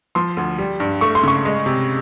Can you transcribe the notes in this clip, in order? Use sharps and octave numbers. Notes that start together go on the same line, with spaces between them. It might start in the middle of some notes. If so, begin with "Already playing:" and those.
F3 C6
D2
G3
G2
A3 C#6
C6
C#3 C#6
G#3
C3